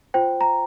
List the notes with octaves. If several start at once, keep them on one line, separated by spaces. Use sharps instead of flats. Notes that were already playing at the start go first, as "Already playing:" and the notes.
F4 C5 G5
A#5